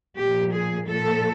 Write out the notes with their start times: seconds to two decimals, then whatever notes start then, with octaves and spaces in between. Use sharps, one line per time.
0.18 A#2 F3 G4
0.53 G#4
0.87 A#2 F3 A4